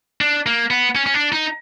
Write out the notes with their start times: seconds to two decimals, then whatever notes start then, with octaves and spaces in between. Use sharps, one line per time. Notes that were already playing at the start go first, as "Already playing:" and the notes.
0.21 D4
0.46 A#3
0.71 B3
0.95 C#4
1.06 C#4
1.14 D4
1.32 D#4